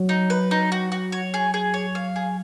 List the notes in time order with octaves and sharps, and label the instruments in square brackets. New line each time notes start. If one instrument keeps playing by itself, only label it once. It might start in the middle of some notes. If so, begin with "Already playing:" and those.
Already playing: [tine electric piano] F#3
[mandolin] D#4
B4
D#4
F#4
F#4
C#5
G#4
G#4
C#5
F5
G#4